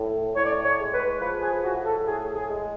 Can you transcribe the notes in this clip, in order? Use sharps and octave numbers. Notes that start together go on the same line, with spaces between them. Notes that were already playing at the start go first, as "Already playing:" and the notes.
Already playing: A2
A2 C#5
D5
C#5
C#5
G#3
B4
F3 B4
G#4
A2 F#4
A4
A2 G#4
G#4
G#3